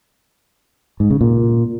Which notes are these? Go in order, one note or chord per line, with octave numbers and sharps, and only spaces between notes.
G#2
C#3
A#2